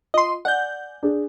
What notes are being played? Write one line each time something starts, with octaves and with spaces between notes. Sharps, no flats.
F4 D#5 C6
D5 F#5 G#5 G6
D4 G#4